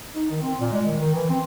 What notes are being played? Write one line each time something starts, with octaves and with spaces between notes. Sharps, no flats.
D#4
D#3
C4
A#2
G#3
D#3
D#3
E3
C4